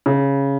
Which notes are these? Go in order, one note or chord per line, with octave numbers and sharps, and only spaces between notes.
C#3